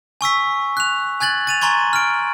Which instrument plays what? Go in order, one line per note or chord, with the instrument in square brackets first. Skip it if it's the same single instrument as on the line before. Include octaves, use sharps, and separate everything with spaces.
[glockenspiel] G#5 C#6 E6 B6
F#6 F7
G#5 F#6 G#6 A6 F#7
A6 D#7 F7
G#5 A#5 C6 C#6 G#6
F6 D7